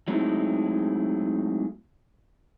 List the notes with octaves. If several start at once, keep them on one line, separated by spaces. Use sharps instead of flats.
F#3 G#3 A3 C4 D#4 E4